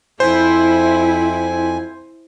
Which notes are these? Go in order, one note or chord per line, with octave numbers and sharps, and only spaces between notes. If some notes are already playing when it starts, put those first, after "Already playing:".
F2 E4 C5 G#5